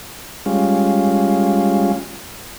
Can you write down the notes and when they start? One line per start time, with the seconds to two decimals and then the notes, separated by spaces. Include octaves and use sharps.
0.46 G3 G#3 C#4 F4